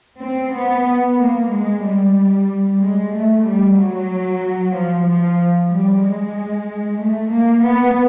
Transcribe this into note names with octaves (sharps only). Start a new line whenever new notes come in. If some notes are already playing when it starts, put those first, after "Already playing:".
C4
B3
A#3
G#3
G3
G#3
A3
G3
F#3
F3
F3
G3
G#3
A3
A#3
B3